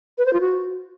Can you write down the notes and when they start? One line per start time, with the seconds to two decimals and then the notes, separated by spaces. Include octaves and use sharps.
0.18 B4
0.26 C5
0.33 F4
0.41 F#4